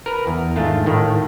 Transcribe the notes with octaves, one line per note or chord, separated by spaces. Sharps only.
A#4 B4
E2
G#2 D#3 A3 D4 F4
A2 D#3 A3